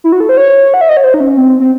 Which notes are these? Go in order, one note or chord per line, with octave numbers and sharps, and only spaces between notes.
E4
F#4
A4
C5
C#5
F#5
E5
D#5
C#5
C5
D#4
C#4
C4
C4